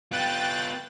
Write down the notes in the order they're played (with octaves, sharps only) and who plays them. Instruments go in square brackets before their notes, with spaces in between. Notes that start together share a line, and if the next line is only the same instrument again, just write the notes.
[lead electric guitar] B3 F4 [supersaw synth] G5 F#6 A6